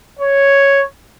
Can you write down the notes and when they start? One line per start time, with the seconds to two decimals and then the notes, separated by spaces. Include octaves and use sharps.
0.19 C#5